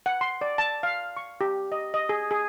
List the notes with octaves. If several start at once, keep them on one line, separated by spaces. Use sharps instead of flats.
F#5
C6
D5
A5
F5
C#6
G4
D#5
D#5
G#4
G#4